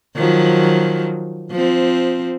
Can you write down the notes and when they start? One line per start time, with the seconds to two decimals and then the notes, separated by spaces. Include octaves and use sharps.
0.16 D#3 F3 F#3
1.51 F3 C4